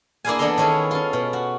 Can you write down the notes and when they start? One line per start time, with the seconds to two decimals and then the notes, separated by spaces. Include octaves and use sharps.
0.25 A#3 D4 E4 G#4 F5 G#5
0.39 E3 B3 D4 A4 D#5 C6
0.57 D#3 C#4 E4 G#4 A4
0.91 C#4 F4
1.13 B2
1.33 F#4